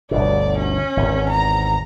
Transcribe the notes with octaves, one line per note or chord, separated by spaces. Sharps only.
G1 D2 B2 D5
C#4
G#1 E2
A#5